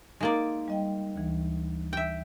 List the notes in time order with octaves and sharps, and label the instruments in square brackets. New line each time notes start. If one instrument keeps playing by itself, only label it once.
[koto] G#3 A#3 D5 [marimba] D#4
[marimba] G3 D#5 G5
D2 E3
[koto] E5 G5